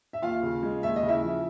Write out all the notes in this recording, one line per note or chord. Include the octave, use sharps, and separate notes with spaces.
E5
D#2 F4 F5
C#3
G#3
D#2 E5
D#5
C#3
E4 E5
F3